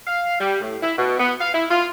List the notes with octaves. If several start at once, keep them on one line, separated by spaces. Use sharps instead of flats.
F5
G3
A2
E4
B2
B3
F5
E4
F4